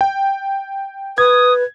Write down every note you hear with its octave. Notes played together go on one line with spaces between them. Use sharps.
G5
B4 D#6 G#6